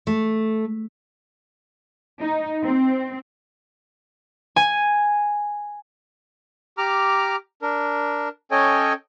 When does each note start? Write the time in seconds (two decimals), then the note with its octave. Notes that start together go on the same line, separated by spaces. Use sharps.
0.07 A3
2.21 D#4
2.65 C4
4.56 G#5
6.78 G4 A#5 D6 F6
7.62 D4 A#4
8.51 C#4 A4 C#5 D#5 G5 G#5